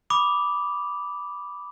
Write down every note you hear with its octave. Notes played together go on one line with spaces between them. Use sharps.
B5 D6 D#6 F7